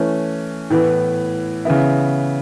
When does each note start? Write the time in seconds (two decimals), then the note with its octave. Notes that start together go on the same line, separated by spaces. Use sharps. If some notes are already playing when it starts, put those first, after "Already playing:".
Already playing: E3 A3 C#4
0.70 A2 E3 B3
1.65 C#3 E3 B3 E4